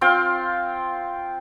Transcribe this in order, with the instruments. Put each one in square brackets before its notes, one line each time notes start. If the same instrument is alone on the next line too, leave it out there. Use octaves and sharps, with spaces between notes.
[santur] C4 F4 F5 G5